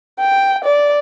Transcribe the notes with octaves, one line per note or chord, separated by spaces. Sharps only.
G5
D5